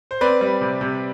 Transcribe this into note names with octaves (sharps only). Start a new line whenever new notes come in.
C5
C4 B4 D5
G3
C3
C3